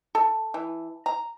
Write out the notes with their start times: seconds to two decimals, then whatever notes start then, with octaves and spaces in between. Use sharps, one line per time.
0.15 A4
0.54 E3
1.06 A#5